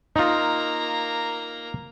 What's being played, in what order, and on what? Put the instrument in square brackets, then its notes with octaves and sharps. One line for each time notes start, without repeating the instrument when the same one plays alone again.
[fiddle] A#3 A#5 [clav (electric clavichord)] D#4 F4